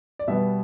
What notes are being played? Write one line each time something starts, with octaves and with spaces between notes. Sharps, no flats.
D5
B2 G3 B3 E5